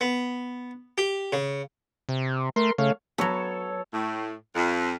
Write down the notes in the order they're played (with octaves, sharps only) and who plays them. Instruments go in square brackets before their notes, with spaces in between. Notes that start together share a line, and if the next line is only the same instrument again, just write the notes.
[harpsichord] B3
G4
C#3
[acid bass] C3
[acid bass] A3 [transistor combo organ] A#4 C6
[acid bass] C#3 [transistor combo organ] A3 C#5 F5
[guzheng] F#3 B3 [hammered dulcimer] A4 C#5
[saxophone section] A2
F2